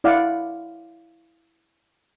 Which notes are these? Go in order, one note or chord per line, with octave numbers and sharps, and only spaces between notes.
E4 D5 F5 F#5